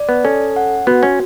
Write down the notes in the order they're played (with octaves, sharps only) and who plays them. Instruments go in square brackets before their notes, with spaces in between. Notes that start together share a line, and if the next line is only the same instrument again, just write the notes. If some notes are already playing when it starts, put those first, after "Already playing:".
Already playing: [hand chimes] D5
[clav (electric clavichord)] B3
[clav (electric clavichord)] C#4 [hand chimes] A4
[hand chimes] F#5
[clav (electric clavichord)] B3 [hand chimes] F#4
[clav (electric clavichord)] C#4